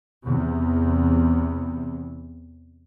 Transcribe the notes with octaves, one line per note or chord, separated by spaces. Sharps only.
E2 C3